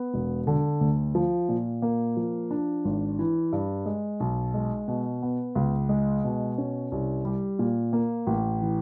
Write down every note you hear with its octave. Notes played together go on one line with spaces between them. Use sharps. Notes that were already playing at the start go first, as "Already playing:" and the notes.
Already playing: B3
E1
D3
D2
F3
A#2
A#3
F3
D4
G#1
E3
G2
G#3
B1
G#3
B2
B3
C#2
G#3
B2
C#4
C2
G3
A#2
A#3
A1
E3